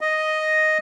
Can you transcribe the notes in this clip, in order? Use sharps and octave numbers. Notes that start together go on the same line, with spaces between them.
D#5